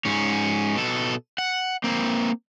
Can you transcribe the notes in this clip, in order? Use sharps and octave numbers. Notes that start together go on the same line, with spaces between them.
G#2 C#4
B2 A4
F#5
A#3 C4